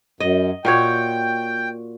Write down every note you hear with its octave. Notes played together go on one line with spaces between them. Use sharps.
F#2 D#5
A#2 F#4 C#5 G5